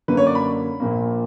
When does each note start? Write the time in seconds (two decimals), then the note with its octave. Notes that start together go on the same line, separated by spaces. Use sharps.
0.08 F#2 D3 A#3 B4
0.17 C#5
0.26 D5
0.35 B5
0.80 A#1 A#2 A#3